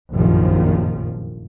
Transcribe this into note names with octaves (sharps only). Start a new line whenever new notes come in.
F1 A#1 F#2 D#3 F3